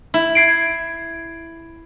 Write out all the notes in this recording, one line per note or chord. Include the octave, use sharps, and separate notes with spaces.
E4
G#6 C7 D7